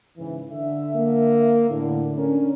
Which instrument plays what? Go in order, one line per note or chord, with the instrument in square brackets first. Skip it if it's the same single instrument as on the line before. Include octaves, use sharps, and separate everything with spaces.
[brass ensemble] G#2 C#3 E3
D3 E5
[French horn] A#3
[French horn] A2 [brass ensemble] D3
[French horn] C#4 [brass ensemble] D4 A#4